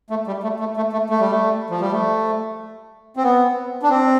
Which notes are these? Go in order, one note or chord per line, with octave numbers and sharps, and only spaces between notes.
A3
G3
A3
A3
A3
A3
A3
G3
A3
F3
G3
A3
C4
B3
D4
C4